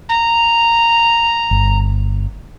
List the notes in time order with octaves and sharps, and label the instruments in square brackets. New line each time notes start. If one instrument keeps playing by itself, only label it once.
[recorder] A#5
[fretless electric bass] G1